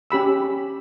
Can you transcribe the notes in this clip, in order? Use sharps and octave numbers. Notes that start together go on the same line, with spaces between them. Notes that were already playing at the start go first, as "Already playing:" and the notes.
C#4 G4 B5 E6